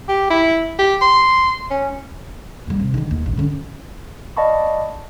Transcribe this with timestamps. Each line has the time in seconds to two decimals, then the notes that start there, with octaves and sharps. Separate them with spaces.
0.09 G4
0.30 E4
0.79 G4
1.01 C6
1.71 C#4
2.67 D#2 G3
2.80 C3
2.94 D3 D#3
3.11 D#2
3.26 A1
3.37 D3 C#4
4.37 D5 D#5 F5 A5 B5 C#6